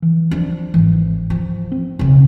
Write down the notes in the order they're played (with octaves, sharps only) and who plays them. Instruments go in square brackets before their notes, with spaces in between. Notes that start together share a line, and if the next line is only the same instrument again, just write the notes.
[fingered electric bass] E3
[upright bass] F3 D4
[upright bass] G#1 [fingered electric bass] E3
[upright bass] F3
[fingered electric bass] C4
[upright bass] B1 C#3